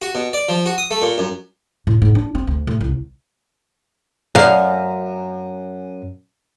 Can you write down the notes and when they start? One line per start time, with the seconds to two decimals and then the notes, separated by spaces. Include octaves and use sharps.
0.02 F#4
0.15 B2
0.33 D5
0.49 F3
0.66 F#4
0.78 D#6
0.91 A3
1.02 A#2
1.18 F#2
1.87 A2
2.02 G#2
2.15 D4
2.35 C4
2.47 D2
2.67 A2
2.81 C2
4.35 F#2 F5